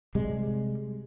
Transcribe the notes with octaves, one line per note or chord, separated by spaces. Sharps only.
C3 G3 G#3